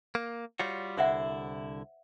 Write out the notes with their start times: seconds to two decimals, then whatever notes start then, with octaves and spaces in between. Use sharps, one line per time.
0.15 A#3
0.59 G3 F4 F#4 C#5
0.97 C2 D3 E4 C5 E5 F#5